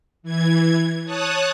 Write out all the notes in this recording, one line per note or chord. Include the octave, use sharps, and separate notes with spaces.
E3 G#6
C#5 A5 D#6 F#6